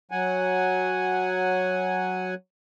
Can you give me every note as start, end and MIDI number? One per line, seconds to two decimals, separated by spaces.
0.11 2.34 54
0.11 2.34 78
0.11 2.34 80